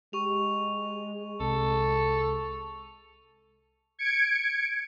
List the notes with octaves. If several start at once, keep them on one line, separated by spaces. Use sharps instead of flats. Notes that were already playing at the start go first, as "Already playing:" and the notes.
G#3 G4 C#6 F7
C2 C3 A4
G#6 C#7 D7